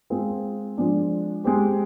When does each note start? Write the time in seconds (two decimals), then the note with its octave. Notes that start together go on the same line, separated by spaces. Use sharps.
0.10 G#3 C4 F4 G#4
0.78 F3 G#3 D4
1.44 G#3 C4 G4